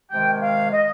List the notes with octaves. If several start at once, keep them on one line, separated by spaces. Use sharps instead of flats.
C3 D#3 G#3 G5
G5
F5
D#5